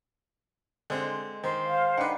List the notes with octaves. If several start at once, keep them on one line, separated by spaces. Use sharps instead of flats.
D3 G#3 C4
D#3 C5
F5
D#3 D4 D#4 B4 F#5